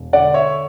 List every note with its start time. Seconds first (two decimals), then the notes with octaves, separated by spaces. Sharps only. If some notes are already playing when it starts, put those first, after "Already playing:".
Already playing: E1
0.13 D3 D5 F#5
0.34 C#5 E5